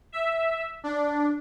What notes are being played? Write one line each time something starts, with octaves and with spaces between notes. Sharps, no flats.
E5
D4